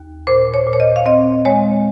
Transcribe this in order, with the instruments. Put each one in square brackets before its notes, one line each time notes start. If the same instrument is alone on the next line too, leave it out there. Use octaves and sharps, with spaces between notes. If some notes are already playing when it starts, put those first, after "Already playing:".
Already playing: [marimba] D#2
A#2 C5
C#5
A#2
C#5
D#5
F5
C4 D#5
G#3 C#5